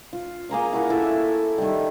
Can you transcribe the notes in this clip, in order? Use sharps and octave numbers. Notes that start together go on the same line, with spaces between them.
F4
A#3 G#4 A#5 C6
E4 F#4 A#4
E4 A4 E5 C#6
D#3 G3